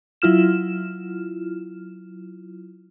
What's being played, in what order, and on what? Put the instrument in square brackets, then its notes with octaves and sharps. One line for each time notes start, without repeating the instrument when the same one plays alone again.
[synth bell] F#3 E4 F4 F6 E7